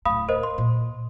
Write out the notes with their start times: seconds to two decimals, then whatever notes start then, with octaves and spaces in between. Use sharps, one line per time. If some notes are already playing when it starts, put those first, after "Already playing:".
0.05 D1 A3 F5 B5 D#6
0.29 A#4 C5 D#5
0.43 C6
0.58 A#2